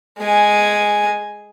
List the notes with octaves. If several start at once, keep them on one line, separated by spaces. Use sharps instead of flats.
G#3 G#5